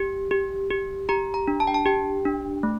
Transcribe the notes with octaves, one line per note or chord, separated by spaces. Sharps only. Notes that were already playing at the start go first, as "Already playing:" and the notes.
Already playing: G4
G4
G4
G4 A#5
A#5
D4
A5
G5
A5
G4 G5
D4
A3